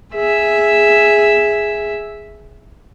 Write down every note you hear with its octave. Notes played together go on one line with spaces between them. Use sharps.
G#4 E5